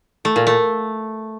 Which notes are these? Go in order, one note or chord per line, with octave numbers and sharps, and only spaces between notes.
A3
A#2
A3